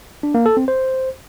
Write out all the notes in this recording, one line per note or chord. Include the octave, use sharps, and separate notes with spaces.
D4
A#3
A4
C4
C5